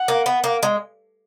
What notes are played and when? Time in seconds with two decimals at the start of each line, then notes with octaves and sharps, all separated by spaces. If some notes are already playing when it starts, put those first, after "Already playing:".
Already playing: F#5
0.08 A#3
0.26 B3
0.44 A#3
0.63 G#3